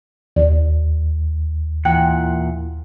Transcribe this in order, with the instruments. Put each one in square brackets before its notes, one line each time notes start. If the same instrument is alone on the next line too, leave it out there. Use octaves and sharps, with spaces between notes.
[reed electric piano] D#2 [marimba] D5
[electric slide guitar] A#2 E3 F#5 [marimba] G5